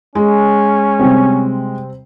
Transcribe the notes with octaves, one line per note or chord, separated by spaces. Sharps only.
G#3 C#4
C3 G3 C4